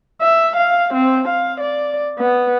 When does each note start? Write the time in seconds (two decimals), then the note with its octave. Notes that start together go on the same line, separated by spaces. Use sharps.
0.21 E5
0.56 F5
0.94 C4
1.28 F5
1.60 D5
2.18 B3